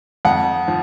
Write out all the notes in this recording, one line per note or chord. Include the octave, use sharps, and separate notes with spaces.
F2 F#5
F3